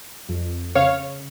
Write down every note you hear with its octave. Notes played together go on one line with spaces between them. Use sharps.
F2
C#3 C#5 F5